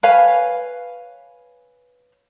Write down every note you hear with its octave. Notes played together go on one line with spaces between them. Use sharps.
B4 C#5 F5 G#5